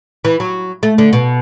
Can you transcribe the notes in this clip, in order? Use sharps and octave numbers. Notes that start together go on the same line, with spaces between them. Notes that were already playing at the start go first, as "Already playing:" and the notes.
E3
F#3
A3
D3
B2